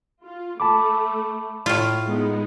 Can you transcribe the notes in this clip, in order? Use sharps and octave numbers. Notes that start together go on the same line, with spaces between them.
F4
A3 A5 B5 D6
A2 F4
G#3 B3 D#4